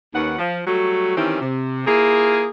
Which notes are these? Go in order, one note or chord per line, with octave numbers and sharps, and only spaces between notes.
D#2 D#3 C#4 B4 F#5
F3
F#3 G3 A3 F#4
D#3 E3 C4 C#4 E4 G4
C3
A#3 E4 F4 G#4